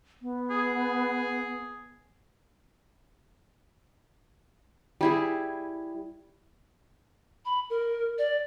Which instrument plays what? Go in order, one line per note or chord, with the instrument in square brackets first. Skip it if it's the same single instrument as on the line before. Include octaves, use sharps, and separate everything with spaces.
[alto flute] B3
[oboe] G#4
[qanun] G3 E4 G#4
[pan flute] B5
A#4
D5